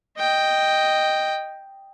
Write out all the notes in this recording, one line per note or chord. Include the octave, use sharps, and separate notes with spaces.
D#5 G5